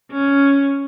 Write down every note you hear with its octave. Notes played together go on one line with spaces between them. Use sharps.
C#4